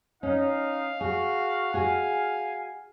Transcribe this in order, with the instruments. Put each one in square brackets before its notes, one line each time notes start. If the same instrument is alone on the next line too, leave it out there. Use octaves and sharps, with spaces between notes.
[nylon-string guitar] C#4 [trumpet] D#4 [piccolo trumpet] F5
[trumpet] F#4 [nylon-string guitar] G#4
[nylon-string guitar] F#4 G#4 [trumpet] G#5